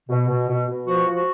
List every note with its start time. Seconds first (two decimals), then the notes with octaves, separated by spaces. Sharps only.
0.09 B2
0.28 B2
0.48 B2
0.68 B2
0.86 F3 F#4
1.06 F3
1.16 F#4